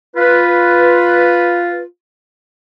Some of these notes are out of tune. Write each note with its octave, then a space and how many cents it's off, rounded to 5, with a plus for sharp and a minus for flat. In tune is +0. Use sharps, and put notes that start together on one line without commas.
F4 +0 B4 +0